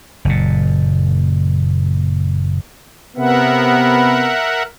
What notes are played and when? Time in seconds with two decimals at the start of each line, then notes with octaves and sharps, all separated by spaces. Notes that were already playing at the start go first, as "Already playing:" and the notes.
0.25 F#1 A#2
3.17 C3 B3 A#4 E5 F#5